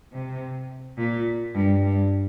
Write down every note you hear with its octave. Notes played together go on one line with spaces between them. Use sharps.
C3
A#2
G2
G2